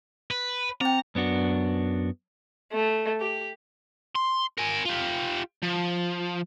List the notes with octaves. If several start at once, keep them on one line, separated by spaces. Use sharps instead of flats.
B4
C4 G5 A#5
F#2 B3 D4 F#4
A3
G4
C6
A#4 G#5
F4 G4
F3